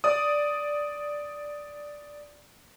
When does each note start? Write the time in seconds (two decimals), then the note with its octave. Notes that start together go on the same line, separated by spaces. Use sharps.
0.04 D5 D#6